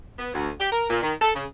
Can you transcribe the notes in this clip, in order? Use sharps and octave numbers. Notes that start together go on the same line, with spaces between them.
B3
D2
G4
A#4
A#2
D#3
A4
C#3